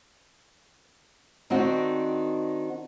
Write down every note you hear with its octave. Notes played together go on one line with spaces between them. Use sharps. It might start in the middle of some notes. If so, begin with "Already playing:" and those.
D#3 C4 D4 D#4 F#4